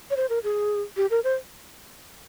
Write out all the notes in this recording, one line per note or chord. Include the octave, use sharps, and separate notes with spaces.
C#5
C5
A#4
G#4
G4
A#4
C5